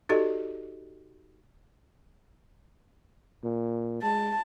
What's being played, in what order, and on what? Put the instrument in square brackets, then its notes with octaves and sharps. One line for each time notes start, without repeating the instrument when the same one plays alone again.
[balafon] D#4 F#4 G4 A4 D5 D#5
[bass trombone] A#2
[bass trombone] G#3 [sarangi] A5